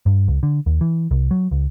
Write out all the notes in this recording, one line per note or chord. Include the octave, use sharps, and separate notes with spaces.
G2
C#2
D3
D#2
E3
C2
F#3
C#2